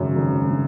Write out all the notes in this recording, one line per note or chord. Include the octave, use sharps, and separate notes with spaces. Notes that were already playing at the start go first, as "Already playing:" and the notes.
Already playing: G#1 F#2 C#3
G#1
C#3